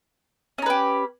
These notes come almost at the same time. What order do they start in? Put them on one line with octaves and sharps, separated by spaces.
C#4 D#4 B4 G4